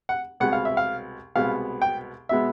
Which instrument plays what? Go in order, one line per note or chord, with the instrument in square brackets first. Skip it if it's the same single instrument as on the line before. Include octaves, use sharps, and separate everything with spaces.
[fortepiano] F#5
C2 B2 G#3 B3 F#5
F5
E5
F5
C2 B2 G#3 B3 F5
G5
B2 G#3 B3 E5